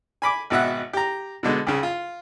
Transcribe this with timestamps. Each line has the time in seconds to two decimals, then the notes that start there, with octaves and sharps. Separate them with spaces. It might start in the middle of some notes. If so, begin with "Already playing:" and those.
0.22 G#5 B5 D6
0.50 G#1 B2 E5 F#5
0.93 G4 A#5
1.43 B2 D3 G#3 B3
1.67 C2 C#3
1.83 F4